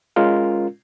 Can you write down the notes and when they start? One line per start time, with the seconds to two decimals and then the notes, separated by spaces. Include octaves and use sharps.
0.16 G#3 C#4 F4 A#4